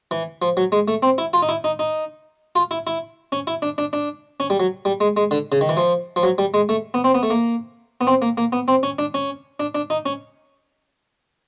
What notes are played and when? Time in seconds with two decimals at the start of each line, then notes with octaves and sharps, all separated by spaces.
0.11 E3
0.42 F3
0.57 F#3
0.72 G#3
0.88 A3
1.03 C4
1.18 E4
1.33 F4
1.42 D#4
1.49 E4
1.64 D#4
1.79 D#4
2.56 F4
2.71 E4
2.87 E4
3.32 C#4
3.47 E4
3.62 D4
3.78 D4
3.93 D4
4.40 C#4
4.50 G3
4.60 F#3
4.85 G3
5.01 G#3
5.17 G#3
5.31 D3
5.52 C#3
5.61 D#3
5.69 E3
5.77 F3
6.16 F3
6.23 F#3
6.38 G3
6.54 G#3
6.69 A3
6.94 B3
7.04 C4
7.15 B3
7.23 A3
7.30 A#3
8.01 B3
8.07 C4
8.22 A#3
8.37 A#3
8.52 B3
8.68 C4
8.83 C#4
8.99 D4
9.14 C#4
9.60 D4
9.75 D4
9.90 D#4
10.06 C#4